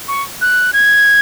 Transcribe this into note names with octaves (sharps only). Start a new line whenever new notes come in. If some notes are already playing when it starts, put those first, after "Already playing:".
C#6
F#6
G#6